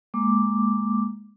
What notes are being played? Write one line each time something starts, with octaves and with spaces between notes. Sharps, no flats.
G#3 A#3 D6